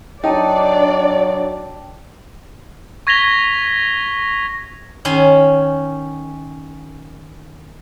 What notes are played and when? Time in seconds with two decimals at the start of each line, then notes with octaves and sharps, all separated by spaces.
0.24 F#3 D4 D#4 D5 G5 A5
3.07 C#6 G#6 A#6 B6 F7 G7
5.05 D#3 C#4 G#5 C6